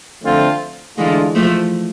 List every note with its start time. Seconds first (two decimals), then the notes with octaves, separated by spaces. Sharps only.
0.23 D3 F3 A3 C4 F4
0.98 D3 E3 G#3 A3 D4 F4
1.35 F3 A3